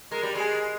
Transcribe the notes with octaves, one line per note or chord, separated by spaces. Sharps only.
G#3 A#4
G3
G#3 G#4